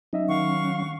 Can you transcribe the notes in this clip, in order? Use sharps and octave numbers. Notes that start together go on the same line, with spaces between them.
F#3 C#4 D#4 D#5 E5
D#3 F5 F#5 C#6